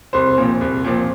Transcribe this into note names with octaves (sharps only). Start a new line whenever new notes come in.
C2 C5
A#2 F3 C4
C2
A#2 F3 C4